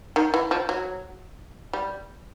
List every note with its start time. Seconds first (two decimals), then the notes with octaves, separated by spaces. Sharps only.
0.16 D#3
0.34 E3
0.51 F3
0.69 F#3
1.73 G3